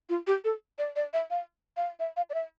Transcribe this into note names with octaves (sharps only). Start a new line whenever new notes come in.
F4
G4
A4
D5
D5
E5
F5
F5
E5
F5
D5
E5